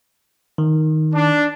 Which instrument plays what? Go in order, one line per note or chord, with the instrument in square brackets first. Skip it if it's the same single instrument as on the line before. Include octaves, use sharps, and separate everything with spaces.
[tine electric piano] D#3
[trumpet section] D4